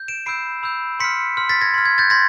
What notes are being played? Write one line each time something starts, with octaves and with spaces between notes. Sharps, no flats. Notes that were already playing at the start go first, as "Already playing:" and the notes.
Already playing: G6
D7 E7
B5 E6 G6 C7 D7
B5 E6 G6
C6 F6 B6 C#7
C6 F6
A6 B6
G#6 A#6
C6 F6
G#6
G6 A6
C6 G#6 A#6